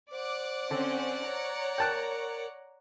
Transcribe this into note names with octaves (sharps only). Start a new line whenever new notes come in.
C5 D5 F#5 D6
D3 C4 C#4
C#5 A#5
A#4 G5 A5 F#6